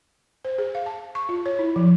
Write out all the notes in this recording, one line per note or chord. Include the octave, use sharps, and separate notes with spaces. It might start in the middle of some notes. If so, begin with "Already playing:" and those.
C5
G#4
F5
A5
C#6
F4
C#5
E4
F3